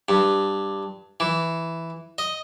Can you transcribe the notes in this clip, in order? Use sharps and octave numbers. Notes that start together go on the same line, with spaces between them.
G2
E3
D#5